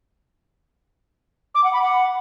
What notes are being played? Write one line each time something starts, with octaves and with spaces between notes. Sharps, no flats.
D6
F#5
B5
F#5